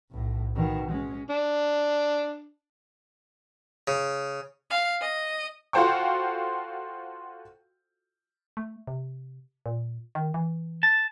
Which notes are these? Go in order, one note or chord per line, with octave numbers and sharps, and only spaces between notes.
B1 A2
B2 D#3
G#3 C#4
D4
C#3
F5
D#5
F4 F#4 A4 C5 G5 C#6
A3
C3
A#2
D#3
E3
A5